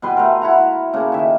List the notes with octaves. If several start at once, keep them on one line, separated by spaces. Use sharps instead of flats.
B2 G3 B4 C6
A3 A#4
E4 F#5 A#5
C#3 A3 A#3
D#3 E5